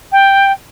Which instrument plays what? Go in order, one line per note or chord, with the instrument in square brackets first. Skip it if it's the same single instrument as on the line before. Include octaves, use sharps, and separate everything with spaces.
[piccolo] G5